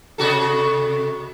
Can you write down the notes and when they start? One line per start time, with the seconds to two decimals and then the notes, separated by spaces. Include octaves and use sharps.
0.18 C3 F#4 A4